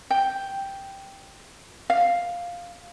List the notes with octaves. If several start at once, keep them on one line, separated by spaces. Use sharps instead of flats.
G5
F5